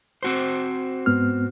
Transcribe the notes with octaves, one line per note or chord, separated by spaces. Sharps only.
C4 F#4 C5
G#2 B3 F6